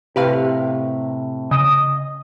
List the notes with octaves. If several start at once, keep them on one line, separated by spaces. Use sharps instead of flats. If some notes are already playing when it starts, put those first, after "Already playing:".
A2 C3 G4 B4 F5
C#3 D#5